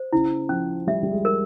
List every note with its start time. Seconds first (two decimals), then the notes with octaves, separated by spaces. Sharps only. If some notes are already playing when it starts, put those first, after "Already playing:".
Already playing: C5
0.13 C#3 E4
0.49 F3 C#4
0.87 G3 E5
1.03 G3
1.12 G#3
1.25 A#4